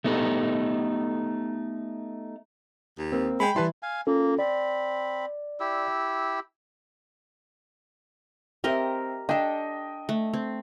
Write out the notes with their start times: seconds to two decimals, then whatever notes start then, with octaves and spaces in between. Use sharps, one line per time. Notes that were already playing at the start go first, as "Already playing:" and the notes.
0.04 A3 B3 D#4 G4 A4
2.98 D#2
3.12 A#3 C4
3.40 G#3 G5 B5
3.56 E3 G3 E4 B4 A5 C6
3.82 F5 G#5
4.07 A#3 C#4 F4 A4
4.39 C4 D5 B5
5.60 E4 G4 E6
8.64 C4 G4 A#4 D#5 E5
9.29 D4 A4 D#5 G5
10.09 A3
10.33 C4